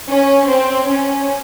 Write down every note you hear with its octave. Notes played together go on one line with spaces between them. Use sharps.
C#4
C4
C#4